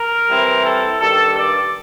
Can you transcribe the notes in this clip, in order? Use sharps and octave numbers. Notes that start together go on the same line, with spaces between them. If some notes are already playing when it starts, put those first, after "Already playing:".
Already playing: A#4
E3 G3 C4 E4
A4
G2 D#3 G3 A4
D5